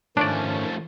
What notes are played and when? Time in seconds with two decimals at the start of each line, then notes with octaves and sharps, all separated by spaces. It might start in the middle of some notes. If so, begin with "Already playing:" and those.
0.17 G#2 D#3 F3 A3 C#4 D4 D5